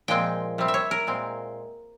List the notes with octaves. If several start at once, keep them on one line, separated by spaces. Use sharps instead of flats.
A#2 F3 G#3 C4 G5
C3 G3 C4
E5
C#5
A#4
A#2 G#3 C4